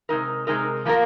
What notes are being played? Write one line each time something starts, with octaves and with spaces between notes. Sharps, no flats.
C3 G#3 D#4 A#4
C3 G#3 D#4 A#4
F3 A#3 F4 A#4